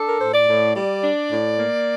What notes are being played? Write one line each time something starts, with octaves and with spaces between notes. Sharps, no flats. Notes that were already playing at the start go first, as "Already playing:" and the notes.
Already playing: D4 A4
A#4
A2 C5
D5
A2
G3 D5
D4
A2
A#3